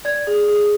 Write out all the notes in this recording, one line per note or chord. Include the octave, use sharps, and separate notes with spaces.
D5 G#6
G#4
G#4